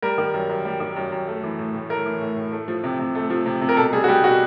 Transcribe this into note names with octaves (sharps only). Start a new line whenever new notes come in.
G3 A#4
D#3
F#2
F#2
G3
D#3
F#2
F#2
A3
E3
A2
A2
A3 A#4
E3
A2
A2
A3
F3
C3
C3
A3
F3
C3
C3
A#4
B2 A4
G3 G#4
F#4
G3 G4
B2 F#4